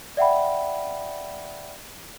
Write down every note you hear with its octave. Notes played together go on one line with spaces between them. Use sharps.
D5 E5 F#5 G5 B5